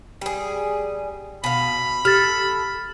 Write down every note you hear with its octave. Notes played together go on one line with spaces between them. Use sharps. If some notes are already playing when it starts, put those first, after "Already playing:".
G3 G#4
B2 F5 B5
G4 A4 F6 A6